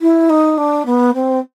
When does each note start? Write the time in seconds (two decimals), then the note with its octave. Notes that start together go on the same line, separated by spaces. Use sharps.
0.01 E4
0.30 D#4
0.58 D4
0.86 B3
1.14 C4